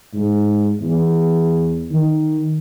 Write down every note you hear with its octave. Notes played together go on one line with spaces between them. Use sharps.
G#2
E2
D#3